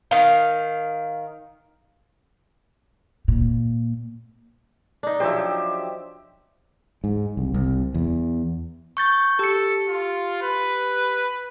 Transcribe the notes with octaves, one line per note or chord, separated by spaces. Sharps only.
D#3 F5
A#2
D4 D#4
F3 F#3 G4 C5 E5
G#2
C2
C2
E2
C#6 G6 A6
G4 A4 C#7
F4
B4